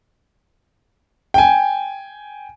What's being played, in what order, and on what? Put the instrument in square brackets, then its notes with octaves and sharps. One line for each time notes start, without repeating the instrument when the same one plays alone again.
[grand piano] G5 G#5